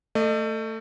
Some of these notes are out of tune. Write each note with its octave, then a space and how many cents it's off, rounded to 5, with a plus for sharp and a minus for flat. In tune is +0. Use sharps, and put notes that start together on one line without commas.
A3 +20 D#5 -25